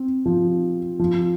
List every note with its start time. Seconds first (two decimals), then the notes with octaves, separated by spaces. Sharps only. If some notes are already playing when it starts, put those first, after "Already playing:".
Already playing: C4
0.26 F3
0.99 F3